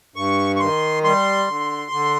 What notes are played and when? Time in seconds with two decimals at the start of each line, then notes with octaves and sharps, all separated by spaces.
0.16 G2 C#6
0.56 C#6
0.60 D#3 C6
1.04 G3 C6
1.48 D3
1.92 D3